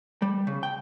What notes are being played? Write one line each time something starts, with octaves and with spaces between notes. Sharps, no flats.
G3
C#3
G5